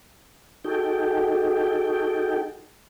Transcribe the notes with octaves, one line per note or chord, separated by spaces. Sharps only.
D#4 F#4 G#4 A4 G5